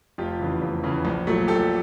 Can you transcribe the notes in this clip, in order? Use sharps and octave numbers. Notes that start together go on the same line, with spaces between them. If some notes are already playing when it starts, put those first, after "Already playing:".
F1 F4 G4
E2 C#3 E3
F1
E2 C#3 E3
A#1
A#2 F#3 A3
A#1 G4 A4